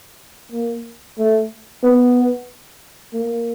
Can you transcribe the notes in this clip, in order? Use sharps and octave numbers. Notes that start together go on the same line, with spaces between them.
A#3
A3
B3
A#3